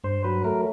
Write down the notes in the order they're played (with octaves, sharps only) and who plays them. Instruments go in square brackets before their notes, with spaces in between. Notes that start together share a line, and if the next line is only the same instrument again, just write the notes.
[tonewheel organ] G2 C5
F#3 B4
A3 A#4